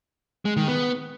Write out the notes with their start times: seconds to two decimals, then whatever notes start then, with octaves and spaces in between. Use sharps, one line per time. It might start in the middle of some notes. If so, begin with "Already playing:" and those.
0.45 G#3
0.57 D#3
0.68 B3